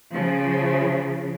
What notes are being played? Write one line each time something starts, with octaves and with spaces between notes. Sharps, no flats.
C#3 F3